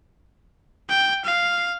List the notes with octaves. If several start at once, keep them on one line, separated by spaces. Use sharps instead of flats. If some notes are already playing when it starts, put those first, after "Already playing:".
G5
F5